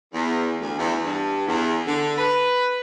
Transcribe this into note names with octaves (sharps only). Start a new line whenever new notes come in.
E2
D2
E2
G2
E2
D3
B4